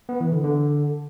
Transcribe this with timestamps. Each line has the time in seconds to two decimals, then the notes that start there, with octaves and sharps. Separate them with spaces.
0.09 B3
0.20 E3
0.32 D3
0.44 D3